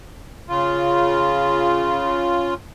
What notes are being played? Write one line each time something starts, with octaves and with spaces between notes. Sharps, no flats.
C#3 F4